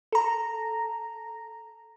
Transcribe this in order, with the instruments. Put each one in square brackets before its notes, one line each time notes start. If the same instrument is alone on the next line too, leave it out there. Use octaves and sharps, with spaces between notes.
[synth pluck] A4 A#5